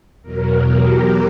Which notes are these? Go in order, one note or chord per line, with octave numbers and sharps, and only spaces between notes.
E2 B2 F#3 A#4
G4